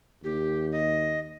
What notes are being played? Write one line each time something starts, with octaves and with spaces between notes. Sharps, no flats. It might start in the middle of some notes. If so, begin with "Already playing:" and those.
D#2 G4
D#5